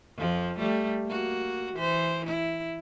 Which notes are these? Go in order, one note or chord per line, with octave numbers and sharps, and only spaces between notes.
F2 F3
G3 A3
A#3 F#4
E3 C5
E4